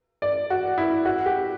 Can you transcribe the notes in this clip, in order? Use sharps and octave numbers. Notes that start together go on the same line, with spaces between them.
D5
F#4
E4
F#4
G4